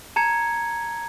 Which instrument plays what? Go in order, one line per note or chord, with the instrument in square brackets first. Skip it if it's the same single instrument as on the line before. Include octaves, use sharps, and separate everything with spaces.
[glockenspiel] A5 A#5 G#6 C#7